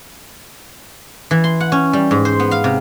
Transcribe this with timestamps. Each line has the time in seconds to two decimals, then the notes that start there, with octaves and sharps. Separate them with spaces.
1.31 E3
1.44 C6
1.60 F#5
1.72 C#4
1.93 G3
2.11 G#2
2.25 C5
2.40 B3
2.51 F5
2.64 C3